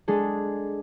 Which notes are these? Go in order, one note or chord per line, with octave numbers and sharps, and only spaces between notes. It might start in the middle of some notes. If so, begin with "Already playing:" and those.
G#3 D4 G#4 A4